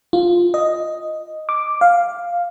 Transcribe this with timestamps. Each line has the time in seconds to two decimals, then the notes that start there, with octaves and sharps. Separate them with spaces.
0.13 F4
0.54 D#5
1.49 D6
1.81 F5